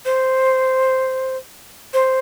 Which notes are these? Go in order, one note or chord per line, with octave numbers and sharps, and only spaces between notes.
C5
C5